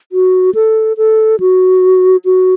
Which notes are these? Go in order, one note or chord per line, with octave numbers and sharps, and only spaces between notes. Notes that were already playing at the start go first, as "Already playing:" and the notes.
F#4
A4
A4
F#4
F#4